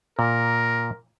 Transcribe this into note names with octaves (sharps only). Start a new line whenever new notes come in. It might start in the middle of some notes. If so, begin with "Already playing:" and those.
A#2 A#4